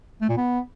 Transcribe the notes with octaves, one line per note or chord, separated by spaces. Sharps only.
A3
A#2
B3